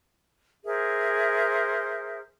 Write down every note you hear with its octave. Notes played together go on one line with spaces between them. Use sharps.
G#4 A#4 C5 E5